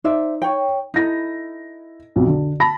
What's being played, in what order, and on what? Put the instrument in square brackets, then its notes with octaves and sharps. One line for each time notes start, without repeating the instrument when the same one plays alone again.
[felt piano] D#4 [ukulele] C5 D5 E5
[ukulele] C#5 G5
[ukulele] D#4 A4 B5 [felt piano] E4 A#6
[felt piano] B1 F2
D3
A5 B5 A#6